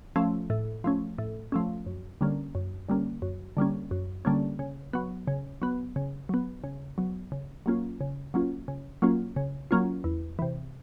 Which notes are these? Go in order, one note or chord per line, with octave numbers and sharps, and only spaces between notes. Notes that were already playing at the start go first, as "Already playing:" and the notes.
F3 A3 C#4
A2
F3 A3 C#4
A2
F3 A3 C#4
F#2
D3 G3 A#3 C#4
F#2
D3 G3 A#3 C#4
F#2
D3 G3 A#3 C#4
F#2
D3 G3 A#3 C#4
C#3
F#3 B3
C#3
F#3 B3
C#3
F#3 B3
C#3
F#3 B3
C#3
F#3 A#3 C#4 F4
C#3
F#3 A#3 C#4 F4
C#3
F#3 A#3 C#4 F4
C#3
F#3 A#3 C#4 F4
E2
C3 E3